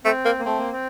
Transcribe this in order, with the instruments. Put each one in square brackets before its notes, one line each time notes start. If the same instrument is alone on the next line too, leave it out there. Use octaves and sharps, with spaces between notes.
[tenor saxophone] A3 [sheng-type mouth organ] C4
[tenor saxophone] A#3
[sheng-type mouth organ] A#3
[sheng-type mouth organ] A3 [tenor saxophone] C4
[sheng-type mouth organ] A#3
C4